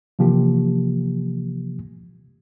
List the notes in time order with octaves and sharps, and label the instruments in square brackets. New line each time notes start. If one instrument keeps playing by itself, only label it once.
[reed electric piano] C3 E3 F3 A#3 G4